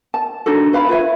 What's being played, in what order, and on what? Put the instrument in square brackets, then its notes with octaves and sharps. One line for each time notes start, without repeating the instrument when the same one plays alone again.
[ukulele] A5
D4 D#4 F#4 A4
B4 F5 B5
F4 B4 C#5 E5